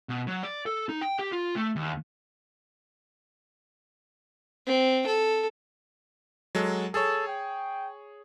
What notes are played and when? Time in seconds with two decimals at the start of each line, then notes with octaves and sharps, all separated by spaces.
0.09 B2
0.27 F#3
0.43 D5
0.66 A4
0.89 D#4
1.01 G5
1.19 G4
1.32 F4
1.56 A3
1.76 D#2
4.67 C4
5.07 A4
6.55 F#3 G#3 A4
6.94 G#4 A4 C#5
7.27 G5